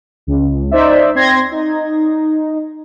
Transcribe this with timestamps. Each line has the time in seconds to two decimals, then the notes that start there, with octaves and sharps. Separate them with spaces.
0.27 C#2
0.71 D#4 C5 D5 E5
1.15 C4 C6 G#6 A#6
1.52 D#4